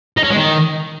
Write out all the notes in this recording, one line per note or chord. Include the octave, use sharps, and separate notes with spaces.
D#4
C#4
G#3
D#3